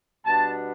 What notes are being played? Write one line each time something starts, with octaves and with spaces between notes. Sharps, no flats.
B2 G3 B3 D4 A5